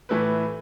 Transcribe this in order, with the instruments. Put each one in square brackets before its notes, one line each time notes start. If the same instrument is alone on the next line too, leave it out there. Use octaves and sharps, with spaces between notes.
[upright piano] A2 E3 A3 E4 B4